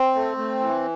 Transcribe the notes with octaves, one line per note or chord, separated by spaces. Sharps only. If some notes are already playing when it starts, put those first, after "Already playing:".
Already playing: C4
A3
A3
E3